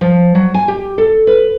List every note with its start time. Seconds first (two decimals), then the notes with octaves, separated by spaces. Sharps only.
0.01 F3
0.35 F#3
0.54 G#5
0.68 G4
0.98 A4
1.27 B4